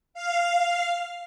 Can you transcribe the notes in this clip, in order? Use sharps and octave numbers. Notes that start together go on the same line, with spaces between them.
F5